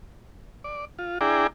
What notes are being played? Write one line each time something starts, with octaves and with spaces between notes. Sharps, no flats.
D5
F4
D4 E4 G#4 D5 G5 A#5